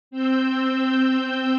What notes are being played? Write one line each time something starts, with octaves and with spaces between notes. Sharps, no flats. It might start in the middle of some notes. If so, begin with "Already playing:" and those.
C4 E6 G6